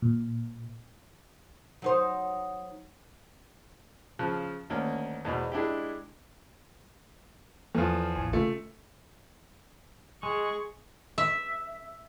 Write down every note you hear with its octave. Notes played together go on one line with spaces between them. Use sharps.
A#2
F#3 D#4 C5
C#3 F3 A5 F#6
D2 D#3 A#3 C#4
E2 G#2 B2
G#3 D4 E4 G4
E2 F3 A4
A1 E3 G#5
C#3 A3 F4
G#3 G#4 C#6
E5